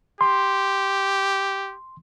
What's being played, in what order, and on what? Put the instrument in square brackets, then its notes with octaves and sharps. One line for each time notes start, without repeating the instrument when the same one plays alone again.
[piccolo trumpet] G4 [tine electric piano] C6